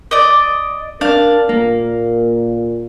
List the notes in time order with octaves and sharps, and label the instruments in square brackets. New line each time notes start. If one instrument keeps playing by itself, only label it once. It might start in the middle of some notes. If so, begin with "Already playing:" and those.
[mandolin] D5 D#5
[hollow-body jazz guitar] D4 [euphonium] A#4 [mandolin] F5
[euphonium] A#2 [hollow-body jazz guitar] A#3